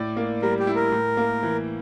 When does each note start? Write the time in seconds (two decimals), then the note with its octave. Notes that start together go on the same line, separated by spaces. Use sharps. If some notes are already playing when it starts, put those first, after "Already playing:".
Already playing: A2 D5
0.16 A#3
0.42 G3 A#4
0.59 G4
0.67 E4
0.75 A#4
0.92 A2
1.17 A#3
1.43 E3